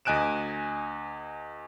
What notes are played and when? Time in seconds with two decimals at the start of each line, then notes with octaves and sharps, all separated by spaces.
0.05 D2 D#5 G#5 F#6 D7 E7